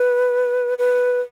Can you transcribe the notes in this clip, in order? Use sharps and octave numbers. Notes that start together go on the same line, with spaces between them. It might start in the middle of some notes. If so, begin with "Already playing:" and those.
Already playing: B4
B4